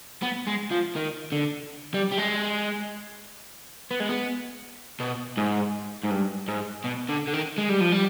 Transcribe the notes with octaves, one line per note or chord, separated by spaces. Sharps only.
B3
G#3
F3
D#3
D3
G3
G3
G#3
B3
G#3
B3
B2
G#2
G#2
G2
G#2
B2
D3
D3
D#3
G#3
G3
F3
G3